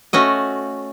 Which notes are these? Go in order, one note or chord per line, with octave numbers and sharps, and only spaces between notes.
A3 C#4 F#4 D#5